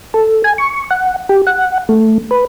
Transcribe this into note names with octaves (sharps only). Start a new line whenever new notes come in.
A4
G#5
C#6
F#5
G4
F#5
A3
B4